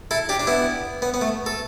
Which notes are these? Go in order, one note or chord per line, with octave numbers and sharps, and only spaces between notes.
E4 A4
D4 G4
D4
B3 E4
B3
B3
A3
A4